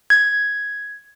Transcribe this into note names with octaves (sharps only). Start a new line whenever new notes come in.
G#6